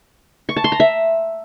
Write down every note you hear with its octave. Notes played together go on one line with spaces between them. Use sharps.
C#6
A5
C6
A#5
E5